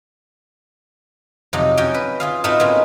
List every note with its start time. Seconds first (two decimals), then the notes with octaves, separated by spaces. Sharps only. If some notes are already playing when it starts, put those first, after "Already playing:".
1.53 F2 C3 F#3 D#4
1.77 C#4 F#4 C#5 G5
1.95 B4
2.20 F4 G#4 F5
2.44 A2 A3 C4 D#4 F4 F#4
2.60 G#3 A#3 B3 C#4